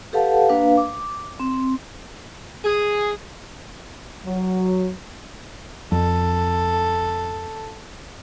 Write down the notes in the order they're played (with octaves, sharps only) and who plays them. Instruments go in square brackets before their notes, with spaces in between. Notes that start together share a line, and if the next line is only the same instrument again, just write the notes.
[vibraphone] G4 A4 B4 F5 F#5 A5
A#3 D4 B4 F5
D6
C4
[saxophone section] G#4
[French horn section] F#3
[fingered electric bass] F2 [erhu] A4